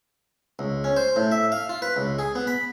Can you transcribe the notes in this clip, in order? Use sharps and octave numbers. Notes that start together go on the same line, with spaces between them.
C#2
C#4
C5
A2
E5
F5
F4
B4
C#2
G#4
B3
B5